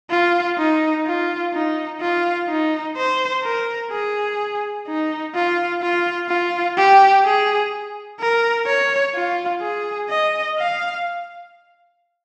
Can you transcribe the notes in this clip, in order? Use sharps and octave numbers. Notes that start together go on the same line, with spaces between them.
F4
D#4
F4
D#4
F4
D#4
C5
A#4
G#4
D#4
F4
F4
F4
G4
G#4
A#4
C#5
F4
G#4
D#5
F5